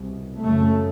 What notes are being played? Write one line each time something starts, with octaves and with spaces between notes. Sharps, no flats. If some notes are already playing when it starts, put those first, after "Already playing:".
Already playing: C2 B2
F#2 C#3 A3